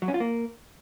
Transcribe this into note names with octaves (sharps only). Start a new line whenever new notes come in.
F#3
C#4
F4
A#3